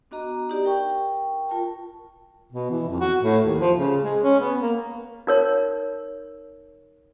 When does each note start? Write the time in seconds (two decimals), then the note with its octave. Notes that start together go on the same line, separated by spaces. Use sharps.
0.11 B3 D4 F#4 D#5 A#5
0.49 D#4 G4 D5
0.65 A#4 G5 C#6
1.49 F4 A#4 G5 A5
2.52 B2
2.71 E3
2.88 F2
3.00 F#4
3.22 A2
3.46 D#2
3.60 F3
3.76 C#3
4.03 G#3
4.21 C#4
4.40 B3
4.61 A#3
5.27 D#4 A#4 C#5